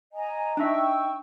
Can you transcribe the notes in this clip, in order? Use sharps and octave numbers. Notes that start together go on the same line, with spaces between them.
D#5 G#5 A#5
D4 D#4 E5 G5 C#6 E6